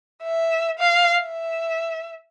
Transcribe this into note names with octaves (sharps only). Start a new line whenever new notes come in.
E5
F5
E5